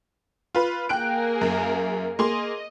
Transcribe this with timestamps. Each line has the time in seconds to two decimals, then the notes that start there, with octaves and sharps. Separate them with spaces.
0.55 F4 B4
0.89 A#3 G#4 A#4 G5 F#6 D7
1.41 F#2
2.19 A#3 G#4 D#5 C6